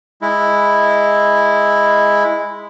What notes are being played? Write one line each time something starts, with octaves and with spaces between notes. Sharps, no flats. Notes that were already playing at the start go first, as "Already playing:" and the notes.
G#3 E4